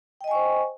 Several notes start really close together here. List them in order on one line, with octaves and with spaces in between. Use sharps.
G5 D#5 G#5 C#6 C5